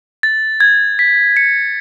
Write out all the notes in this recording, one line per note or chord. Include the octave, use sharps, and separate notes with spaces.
A6
G#6
B6
C#7